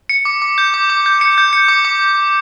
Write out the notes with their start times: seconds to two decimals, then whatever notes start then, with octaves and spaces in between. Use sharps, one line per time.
0.09 C#7
0.25 D6
0.42 D6
0.58 G6
0.74 D6
0.90 D6
1.06 G6
1.21 C#7
1.38 G6
1.53 C#7
1.68 D6
1.85 D6